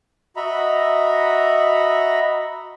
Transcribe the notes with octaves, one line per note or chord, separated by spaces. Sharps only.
F#4 D#5 E5 A#5 B5